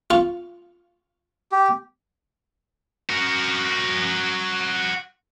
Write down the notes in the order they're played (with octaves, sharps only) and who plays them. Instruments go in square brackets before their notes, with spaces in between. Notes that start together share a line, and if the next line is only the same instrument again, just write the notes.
[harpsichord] F4 C#6
[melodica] G4
[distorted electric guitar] F#4 A#4